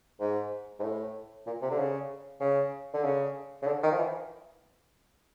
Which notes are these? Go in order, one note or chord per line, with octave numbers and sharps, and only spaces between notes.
G#2
G#2
A2
A#2
C3
D3
C#3
C#3
D3
C#3
C#3
D3
D#3
F3
E3